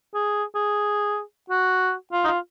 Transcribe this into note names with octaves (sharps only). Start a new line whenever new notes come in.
G#4
G#4
F#4
F4
D#4
F4